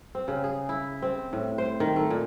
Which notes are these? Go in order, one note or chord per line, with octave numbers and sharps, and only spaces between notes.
C4
C#3
G#4
E4
C4
A2
C5
D#3
A3
A#2